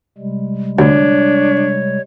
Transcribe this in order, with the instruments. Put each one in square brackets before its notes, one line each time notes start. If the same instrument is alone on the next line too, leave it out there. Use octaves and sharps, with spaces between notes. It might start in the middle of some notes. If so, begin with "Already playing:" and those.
[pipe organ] C3 G3 G#3
[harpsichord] D2 [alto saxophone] D4 [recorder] C#5